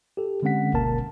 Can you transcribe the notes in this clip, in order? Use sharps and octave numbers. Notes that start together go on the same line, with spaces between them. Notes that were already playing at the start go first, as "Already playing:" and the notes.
G4 A4
D3 G#3 C4 C#4 F#5 B6
G1 D2 B2 A#3 A#4 A5